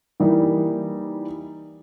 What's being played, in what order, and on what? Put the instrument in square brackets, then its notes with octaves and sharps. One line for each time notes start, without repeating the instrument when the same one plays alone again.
[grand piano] E3 G3 A#3 D#4